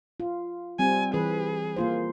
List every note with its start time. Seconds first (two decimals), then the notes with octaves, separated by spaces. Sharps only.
0.20 F4
0.79 G3 C4 G#5
1.14 E3 G#4 B4
1.76 A#3 F4 C5